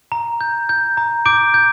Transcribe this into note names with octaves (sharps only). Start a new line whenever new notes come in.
A#5
G6
G6
A#5
D6 G6 D7
G6